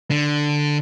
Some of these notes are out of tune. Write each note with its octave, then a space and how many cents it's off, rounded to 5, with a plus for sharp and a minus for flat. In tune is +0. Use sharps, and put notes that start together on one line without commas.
D3 +5